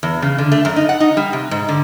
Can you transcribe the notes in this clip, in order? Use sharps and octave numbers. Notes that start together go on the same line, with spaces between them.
E2
C#3
D3
A3
F#2
D#4
F#5
D#4
G3
C3
G#2
D3